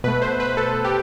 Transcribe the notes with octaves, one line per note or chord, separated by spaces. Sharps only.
B2 A3 B4
C5
B4
A4
G4